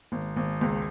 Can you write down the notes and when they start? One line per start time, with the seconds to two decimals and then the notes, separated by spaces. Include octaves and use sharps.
0.12 G#1
0.36 G#1
0.61 C#2